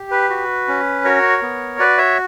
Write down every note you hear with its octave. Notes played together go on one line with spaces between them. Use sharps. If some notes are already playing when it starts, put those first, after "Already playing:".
Already playing: G4
B4
F#4
C#4
F#4 A#4 C#5
B3
F#4 B4 D5
C#5 E5